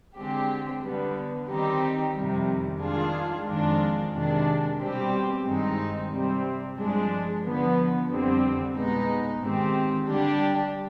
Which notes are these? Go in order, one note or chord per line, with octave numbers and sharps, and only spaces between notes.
D3 G#3 C4 G4
D3 G3 B3
D#3 G3 C4 D#4 G4
F2 C3 D#3 G3
D#3 G#3 D4 F4 G#4
F2 D#3 G#3 D4 F4
C3 D#3 G#3 D4
B2 G3 C4 G4
G2 D#3 G#3 C4 D#4
C3 G3 C4
G2 F3 G#3 D4
D3 F3 B3
F2 D3 G3 C4
B2 G#3 B3 D#4
G#2 D#3 G#3 C4 G4
D3 G3 D4 G4